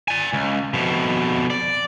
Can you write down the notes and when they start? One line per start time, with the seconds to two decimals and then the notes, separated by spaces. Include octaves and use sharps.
0.08 D5 G#5
0.33 C#2
0.74 F2 B2
1.50 D5